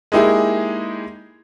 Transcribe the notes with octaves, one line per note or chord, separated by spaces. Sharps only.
G#3 A#3 D#4 E4 G4 G#4